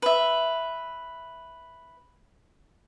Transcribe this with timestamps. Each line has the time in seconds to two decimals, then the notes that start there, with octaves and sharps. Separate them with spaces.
0.02 B4 E5